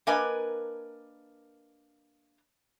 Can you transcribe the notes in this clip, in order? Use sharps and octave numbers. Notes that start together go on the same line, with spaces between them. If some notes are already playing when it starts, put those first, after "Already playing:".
A#3 D4 A#4 B4 D#5 G#5